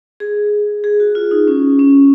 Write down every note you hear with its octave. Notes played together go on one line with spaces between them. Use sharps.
G#4
G#4
F#4
F4
D#4
C#4
C#4